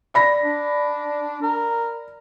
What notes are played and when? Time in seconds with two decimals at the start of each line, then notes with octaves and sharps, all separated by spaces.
0.14 D5 B5 A#6
0.43 D4
1.42 A#4